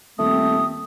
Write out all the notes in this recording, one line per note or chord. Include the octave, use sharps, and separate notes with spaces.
D#1 A3 C4 D#6